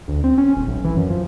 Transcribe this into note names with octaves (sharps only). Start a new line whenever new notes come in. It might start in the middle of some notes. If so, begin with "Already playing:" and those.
D2
C4
C#4
D#1
B1
E3
F#2
F3